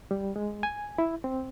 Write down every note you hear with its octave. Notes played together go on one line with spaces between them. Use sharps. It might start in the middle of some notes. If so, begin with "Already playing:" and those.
G3
G#3
G#5
E4
C4